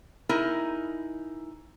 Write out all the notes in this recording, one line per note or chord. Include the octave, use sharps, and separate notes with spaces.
D#4 E4 G#4 A#4